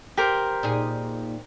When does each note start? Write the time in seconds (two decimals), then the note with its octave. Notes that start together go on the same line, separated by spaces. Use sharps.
0.17 G4 A#4 C5
0.63 A#2 D#4 G#4